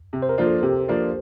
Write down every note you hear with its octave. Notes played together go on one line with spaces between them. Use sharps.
C3
C5
A#4
F3 A#3 D4 F4
A4
C3 G4
F3 A#3 D4 F4